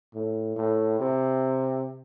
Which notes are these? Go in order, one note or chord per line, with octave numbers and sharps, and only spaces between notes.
A2
A2
C3